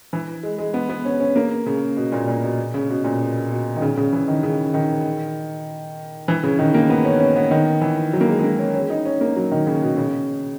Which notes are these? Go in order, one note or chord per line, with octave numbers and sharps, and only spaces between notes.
E3
G#3
G#3
B3
B3
C#4
C#4
A#3
C#3
B2
A#2
A#2
B2
C#3
B2
A#2
B2
B2
D#3
C#3
C#3
E3
D#3
C#3
D#3
E3
C#3
D#3
A#3
B3
C#4
C#4
B3
D#3
E3
F#3
A#3
G#3
G#3
A#3
C#4
C#4
D#4
C#4
A#3
F#3
D#3
C#3
B2
C#3